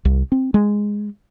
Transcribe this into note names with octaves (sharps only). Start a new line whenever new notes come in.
C2
C4
G#3